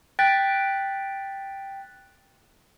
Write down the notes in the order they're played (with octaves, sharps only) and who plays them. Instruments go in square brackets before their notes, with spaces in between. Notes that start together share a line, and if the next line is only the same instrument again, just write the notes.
[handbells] G5 F#6 A6 B6